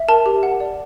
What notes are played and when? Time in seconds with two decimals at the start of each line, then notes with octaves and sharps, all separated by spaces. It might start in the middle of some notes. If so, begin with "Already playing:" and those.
Already playing: E5
0.08 A#4 A5
0.26 G4
0.43 F#5
0.60 D5